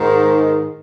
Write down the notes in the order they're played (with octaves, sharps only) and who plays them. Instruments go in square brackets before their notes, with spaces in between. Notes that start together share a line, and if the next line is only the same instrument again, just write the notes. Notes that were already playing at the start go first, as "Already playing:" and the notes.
Already playing: [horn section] G#2 D#3